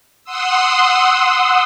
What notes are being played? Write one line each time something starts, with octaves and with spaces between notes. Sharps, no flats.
F#5 C6 D#6 E6